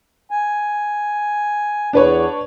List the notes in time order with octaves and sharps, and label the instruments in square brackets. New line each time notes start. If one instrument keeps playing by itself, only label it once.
[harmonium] G#5
[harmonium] E2 [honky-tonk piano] D4 B4 C#5